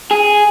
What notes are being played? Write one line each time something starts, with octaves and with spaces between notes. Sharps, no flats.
G#4